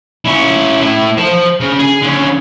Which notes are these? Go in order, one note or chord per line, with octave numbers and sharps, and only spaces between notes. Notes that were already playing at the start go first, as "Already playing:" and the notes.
C#4 E4
A2 E4
C5 A5
C#3
G#4
D3 C#4